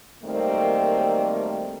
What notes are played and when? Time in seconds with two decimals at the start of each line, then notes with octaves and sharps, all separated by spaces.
0.24 F#2 D#3 G3 A3 A#3 C4